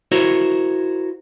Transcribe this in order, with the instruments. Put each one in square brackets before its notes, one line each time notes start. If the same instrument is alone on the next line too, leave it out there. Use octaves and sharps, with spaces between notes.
[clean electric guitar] E4 F#4 A#4 C5 C#5